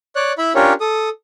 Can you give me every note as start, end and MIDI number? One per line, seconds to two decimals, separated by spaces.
0.16 0.33 73
0.16 0.33 74
0.16 0.33 90
0.38 0.53 64
0.38 0.53 76
0.38 0.53 83
0.55 0.73 61
0.55 0.73 62
0.55 0.73 65
0.55 0.73 67
0.55 0.73 70
0.55 0.73 73
0.81 1.09 69
0.81 1.09 87